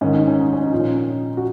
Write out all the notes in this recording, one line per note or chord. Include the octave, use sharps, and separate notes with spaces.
G#2 D#3 C#4
D#4
C#4
D#4
C#4
D#4
A#2 F3
C#4
F#4